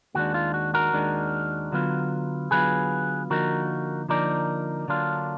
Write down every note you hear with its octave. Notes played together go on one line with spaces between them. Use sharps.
D#2 D#3 G#3 D4 F#4
F4
F#4
F#4 A#4
D#2 D#3 G#3 D4
D3 F#3 B3 F4
D3 F#3 B3 F4 G#4 B4
D3 F3 A#3 D#4 F#4 A#4
D3 F3 A#3 D#4 A#4 D5
D3 F#3 A#3 D4 F4